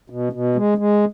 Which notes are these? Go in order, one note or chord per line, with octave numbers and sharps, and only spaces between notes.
B2
B2
G#3
G#3